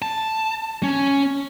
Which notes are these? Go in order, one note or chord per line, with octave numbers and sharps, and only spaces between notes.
A5
C#4